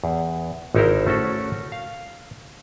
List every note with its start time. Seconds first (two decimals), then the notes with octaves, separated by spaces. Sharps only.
0.04 E2
0.75 G#1 D#4 E4 G4 A#4 C5
1.07 A3 C#4 F#4 A4
1.72 F5